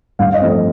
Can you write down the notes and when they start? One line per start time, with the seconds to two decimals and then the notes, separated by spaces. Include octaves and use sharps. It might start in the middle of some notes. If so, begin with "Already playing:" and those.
0.19 G2 F5
0.30 F5
0.34 D#5
0.41 F3 A3 C4
0.49 D#5